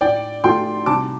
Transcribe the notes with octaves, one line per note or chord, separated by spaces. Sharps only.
A2 D5 G5
F3 A3 F4 G5 C6
C2 A5 D6